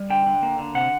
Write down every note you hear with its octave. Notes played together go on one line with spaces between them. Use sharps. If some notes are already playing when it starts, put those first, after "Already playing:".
Already playing: G3
D3 G5
D3
A#3
D3
C3 F#5